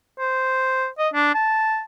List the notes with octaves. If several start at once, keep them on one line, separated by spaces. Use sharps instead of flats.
C5
D#5
D4
A5